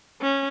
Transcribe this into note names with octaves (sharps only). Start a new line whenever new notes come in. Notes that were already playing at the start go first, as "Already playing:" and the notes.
C#4